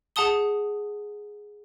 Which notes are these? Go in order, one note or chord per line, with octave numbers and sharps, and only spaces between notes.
G#4 F#5 A5 D#6 G7